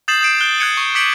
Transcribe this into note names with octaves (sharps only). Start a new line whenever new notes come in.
D#6 G6 A6 C7 E7 F#7
D#6 G6 C7 D7 E7
F#6 G6 D7 G7
F#6 G#6 C#7 D#7
C#6
D6 G6 B6 C#7 D7 F#7